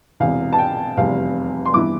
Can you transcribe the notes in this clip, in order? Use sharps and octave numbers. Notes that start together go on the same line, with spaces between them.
E1 E2 C3 F5
A5
G5
F1 E2 C3 G3 C4 F5
C6
G2 E3 B3 E4 D6